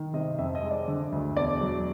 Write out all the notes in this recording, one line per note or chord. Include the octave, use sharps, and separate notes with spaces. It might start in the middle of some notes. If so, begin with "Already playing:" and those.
Already playing: D#3
C3 D#5
F2 E5
D#5
G#3
D5
D3
D2
E1 D5
F#3